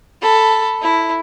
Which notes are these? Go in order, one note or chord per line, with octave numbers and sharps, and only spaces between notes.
A4 B5
E4